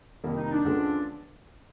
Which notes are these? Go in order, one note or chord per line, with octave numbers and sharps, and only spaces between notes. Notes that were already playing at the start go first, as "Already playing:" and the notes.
F2 C3 D#3 G3 A#3
D#4
D4
D2 C#3 F3 G#3 B3